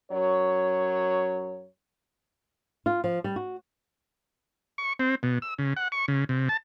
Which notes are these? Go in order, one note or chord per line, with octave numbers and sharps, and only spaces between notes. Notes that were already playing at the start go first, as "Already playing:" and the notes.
F#2 F#3 C#5
F4
F3
G3
F#4
C#6
C4
B2
E6
C#3
F#5
C#6
C#3
C3
A5